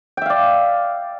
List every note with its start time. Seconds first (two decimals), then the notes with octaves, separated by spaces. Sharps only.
0.17 G5
0.22 E5
0.26 F5
0.30 D5